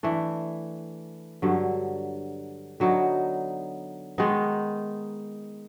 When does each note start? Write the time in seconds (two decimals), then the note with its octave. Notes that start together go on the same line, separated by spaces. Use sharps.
0.03 E3 A3 D4
1.42 G2 D3 F#3
2.80 D3 F#3 B3 D#4
4.18 D#3 G#3 B3 D#4